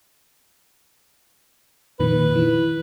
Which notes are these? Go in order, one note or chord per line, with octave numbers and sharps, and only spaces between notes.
F2 A#2 D#3 B4
E3